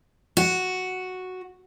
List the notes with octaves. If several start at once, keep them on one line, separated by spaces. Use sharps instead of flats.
F#4